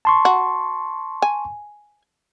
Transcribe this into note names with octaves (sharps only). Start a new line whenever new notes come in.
A5 C6 C#6
F#4
G#5